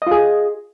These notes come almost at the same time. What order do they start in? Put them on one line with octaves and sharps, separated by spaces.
D#5 F4 G#4